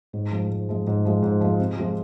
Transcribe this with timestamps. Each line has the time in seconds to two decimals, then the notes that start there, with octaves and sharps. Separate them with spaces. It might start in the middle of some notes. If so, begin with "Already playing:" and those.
0.13 G#2
0.32 F3 G#3
0.51 G#2
0.69 F3 G#3
0.87 G#2
1.05 F3 G#3
1.22 G#2
1.41 F3 G#3
1.59 C3
1.77 F3 G#3 C4 F4